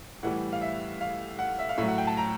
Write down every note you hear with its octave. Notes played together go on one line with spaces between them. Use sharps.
A2 E3 G3 F#5
F5
E5
F5
F#5
E5
F5
A2 F#3 E5
F#5
G5
A5
A#5